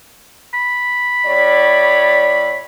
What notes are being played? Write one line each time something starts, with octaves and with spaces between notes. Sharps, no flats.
B5
A2 C#5 D5